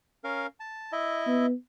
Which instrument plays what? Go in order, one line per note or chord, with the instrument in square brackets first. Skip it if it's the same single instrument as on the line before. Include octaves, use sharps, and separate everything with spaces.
[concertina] C#4 A#4 F5
A5
E4 D#5 E5
[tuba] B3